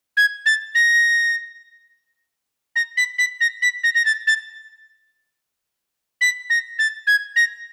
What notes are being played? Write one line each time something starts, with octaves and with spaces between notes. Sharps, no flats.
G#6
A6
A#6
A#6
B6
B6
A#6
B6
A#6
A#6
A6
A6
B6
A#6
A6
G#6
A#6